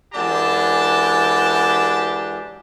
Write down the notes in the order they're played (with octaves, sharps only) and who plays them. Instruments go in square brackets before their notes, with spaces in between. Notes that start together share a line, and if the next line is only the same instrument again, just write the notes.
[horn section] F#2 E3 G#3 D4 G4 A5